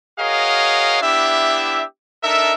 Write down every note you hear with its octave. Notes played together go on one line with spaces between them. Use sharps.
F#4 G#4 A#4 C#5 D#5 F5
B3 D4 E4 G4 E5
D4 D#4 A4 A#4 E5